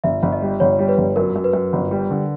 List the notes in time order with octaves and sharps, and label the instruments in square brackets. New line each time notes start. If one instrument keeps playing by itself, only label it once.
[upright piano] G1 [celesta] E5
[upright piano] G1
[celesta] D#5
[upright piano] G3
[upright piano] G1 [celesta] C#5
[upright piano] G3
[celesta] B4
[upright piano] G1
[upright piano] F#2 [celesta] A#4
[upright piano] F#2
[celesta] B4
[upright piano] F#2
G1
G3
D3